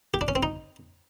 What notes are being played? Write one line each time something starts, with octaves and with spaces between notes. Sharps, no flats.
G4
D4
C#4
C4
D#4